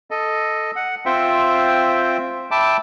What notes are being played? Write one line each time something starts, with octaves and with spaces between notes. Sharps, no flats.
A4 D#5
F#5
C4 F4 C5 E5 G5
E5 G5 A5 B5 D6